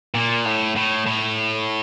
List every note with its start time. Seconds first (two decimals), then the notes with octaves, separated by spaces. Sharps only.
0.14 A#2
0.45 A2
0.76 A2
1.07 A2